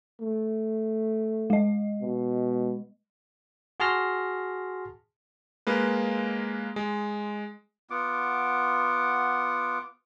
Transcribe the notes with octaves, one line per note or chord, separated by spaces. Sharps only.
A3
G#3 D#5
B2
F#4 G#4 A5 C6 F6 A#6
G#3 A#3 B4
G#3
B3 F4 F#5 D6